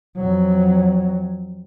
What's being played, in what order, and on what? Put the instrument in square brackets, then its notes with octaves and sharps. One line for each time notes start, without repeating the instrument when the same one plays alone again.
[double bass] F2 F#3